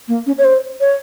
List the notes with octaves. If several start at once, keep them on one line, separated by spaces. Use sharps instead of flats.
A#3
C#4
C#5
C5
C#5